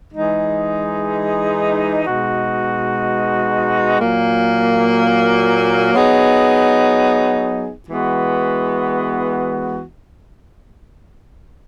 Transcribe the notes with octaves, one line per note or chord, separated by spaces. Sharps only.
E3 G#3 D#4 G#4
B2 G#3 D#4 F#4
A#2 F#3 A#3
F#3 B3 D#4 G#4
E3 G#3 B3 F#4